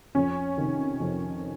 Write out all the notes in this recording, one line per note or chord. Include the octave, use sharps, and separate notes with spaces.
F2 C#4
C3 D#3
F2